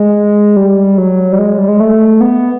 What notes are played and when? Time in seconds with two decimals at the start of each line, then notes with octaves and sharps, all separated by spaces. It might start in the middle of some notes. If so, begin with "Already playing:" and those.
Already playing: G#3
0.56 G3
0.98 F#3
1.32 G3
1.38 G#3
1.58 G3
1.69 G#3
1.80 A3
2.20 B3